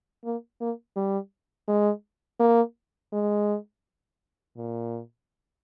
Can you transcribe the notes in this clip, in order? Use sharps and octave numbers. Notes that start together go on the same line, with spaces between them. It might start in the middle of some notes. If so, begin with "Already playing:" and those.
A#3
A#3
G3
G#3
A#3
G#3
A#2